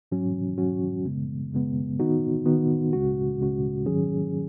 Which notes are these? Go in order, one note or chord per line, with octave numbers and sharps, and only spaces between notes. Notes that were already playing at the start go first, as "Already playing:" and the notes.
G#2 F#3 C#4 F#4
G#2 F#3 C#4 F#4
F#2 C#3 G#3 B3
F#2 C#3 G#3 B3
D#3 B3 D#4 F#4
D#3 B3 D#4 F#4
C#2 C#3 G#3 C#4 F#4
C#2 C#3 G#3 C#4 F#4
G#2 D#3 F#3 C#4 G#4